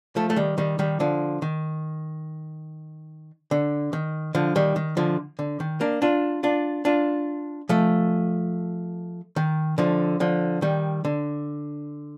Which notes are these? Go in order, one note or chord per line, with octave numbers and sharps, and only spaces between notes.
F3 A3
A3
D#3 G3
D#3 G3
D#3 G3
D3 F3
D#3
D3
D#3
D3 F3
D#3 G3
D#3
D3 F3
D3
D#3
A#3 D4
D4 F4
D4 F4
D4 F4
F3 A3
D#3
D3 F3
D3 F3
D#3 G3
D3